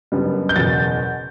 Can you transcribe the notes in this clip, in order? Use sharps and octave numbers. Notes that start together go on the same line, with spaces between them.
F#1 F#2 D3 G3 B3
G6
F#1 E2 B2 A6